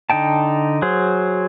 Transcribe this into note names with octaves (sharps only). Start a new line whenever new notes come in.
D3 D#4 G5 A5
F#3 G#4 C5